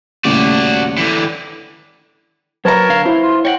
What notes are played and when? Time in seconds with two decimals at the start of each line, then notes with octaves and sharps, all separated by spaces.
0.24 D#1 A2 C#3 F#4 D5
0.97 D3 E3
2.65 F#3 A#4 B4 C#5 A5 A#5
2.89 D3 F5
3.05 E4 C5
3.22 F4
3.45 C#5 D#5 F#5 G5